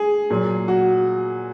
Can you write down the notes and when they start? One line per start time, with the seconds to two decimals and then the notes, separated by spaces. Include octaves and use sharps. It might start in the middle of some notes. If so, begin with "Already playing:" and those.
Already playing: G#4
0.30 A#2 F#3
0.68 F#4